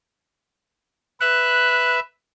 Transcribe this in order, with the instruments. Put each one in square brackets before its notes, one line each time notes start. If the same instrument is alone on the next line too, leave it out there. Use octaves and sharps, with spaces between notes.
[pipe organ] B4 E5 [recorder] F#6